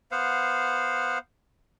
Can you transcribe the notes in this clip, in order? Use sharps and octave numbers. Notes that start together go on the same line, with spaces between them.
B3 C5 F5 F#5